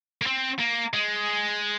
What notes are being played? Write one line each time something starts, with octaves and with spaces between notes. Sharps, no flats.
A#3
C4
A#3
G#3